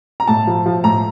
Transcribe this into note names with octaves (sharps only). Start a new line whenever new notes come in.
A#5
A2 A5
F3
F3
A2 A#5